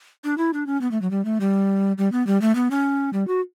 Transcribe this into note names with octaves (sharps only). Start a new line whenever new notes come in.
D4
E4
D4
C#4
B3
A3
F#3
G3
A3
G3
G3
B3
G3
A3
B3
C#4
G3
F#4